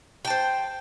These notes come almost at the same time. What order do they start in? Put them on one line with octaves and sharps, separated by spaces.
G5 A5 C5